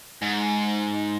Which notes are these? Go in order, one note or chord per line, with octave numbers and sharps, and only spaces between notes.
G#2